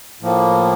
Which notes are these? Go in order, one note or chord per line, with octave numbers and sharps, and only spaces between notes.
A2 F3 A#3